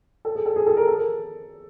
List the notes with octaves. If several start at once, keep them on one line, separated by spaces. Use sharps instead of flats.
A4
G#4
A4
G#4
A4
A#4
A4